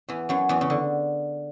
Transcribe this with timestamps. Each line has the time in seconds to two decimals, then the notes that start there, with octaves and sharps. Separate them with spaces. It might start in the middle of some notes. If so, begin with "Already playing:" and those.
0.09 E2 E3
0.29 F#2 F#3
0.49 E2 E3
0.61 C#3
0.70 D3